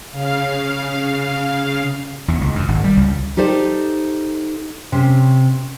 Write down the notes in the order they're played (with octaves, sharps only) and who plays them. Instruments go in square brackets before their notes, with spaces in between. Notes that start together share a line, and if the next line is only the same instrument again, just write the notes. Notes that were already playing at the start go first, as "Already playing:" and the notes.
[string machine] C#3 F5
[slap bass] E2
C#2
F#2
G#1
G3
C#2
[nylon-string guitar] D#4 G4 A4 C5 D5
C3 C4 C#4